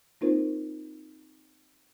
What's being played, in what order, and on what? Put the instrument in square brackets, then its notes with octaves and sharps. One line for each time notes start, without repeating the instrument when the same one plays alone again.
[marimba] A#3 C4 D#4 F4 A#4 C5